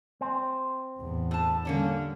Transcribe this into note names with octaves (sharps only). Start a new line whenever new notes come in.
C4
A1 E2
A2 A5
D3 G3 A#3 C#4 D4